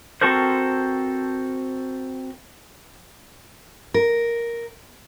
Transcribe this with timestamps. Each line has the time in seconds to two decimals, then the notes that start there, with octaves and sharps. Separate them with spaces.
0.21 C4 F#4 A4 A#4 C5
3.94 A#4